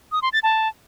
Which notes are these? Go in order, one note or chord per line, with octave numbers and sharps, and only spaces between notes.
D#6
C6
A6
A5